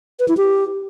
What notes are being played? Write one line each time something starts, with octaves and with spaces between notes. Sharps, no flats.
B4
E4
G4